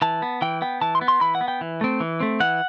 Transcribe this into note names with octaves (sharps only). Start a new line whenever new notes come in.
E3 A5
B3
E3 G5
B3 G5
E3 A5
C6
B3
C6
E3 B5
F#5
B3
G5
E3
A3 C4
E3
A3 C4
E3 F#5